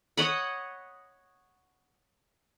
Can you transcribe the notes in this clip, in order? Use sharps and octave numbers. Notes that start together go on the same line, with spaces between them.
C#5 D#5 F#5 B5